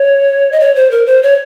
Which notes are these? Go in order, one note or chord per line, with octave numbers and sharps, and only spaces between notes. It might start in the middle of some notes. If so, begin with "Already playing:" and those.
Already playing: C#5
D#5
C#5
C5
A#4
C5
C#5